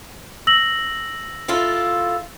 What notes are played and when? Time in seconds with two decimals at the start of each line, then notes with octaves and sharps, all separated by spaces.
0.47 E6 A#6 F#7
1.48 E4 F4 A4